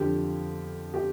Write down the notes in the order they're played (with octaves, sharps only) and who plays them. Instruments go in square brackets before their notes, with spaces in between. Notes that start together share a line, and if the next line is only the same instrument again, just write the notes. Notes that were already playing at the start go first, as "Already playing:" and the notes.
Already playing: [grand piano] F2 D3 F3 G4
G4